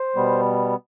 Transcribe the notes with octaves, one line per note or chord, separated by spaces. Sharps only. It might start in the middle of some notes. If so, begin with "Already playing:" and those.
Already playing: C5
B2 G3 B3